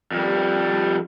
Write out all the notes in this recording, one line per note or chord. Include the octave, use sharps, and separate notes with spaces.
F2 G3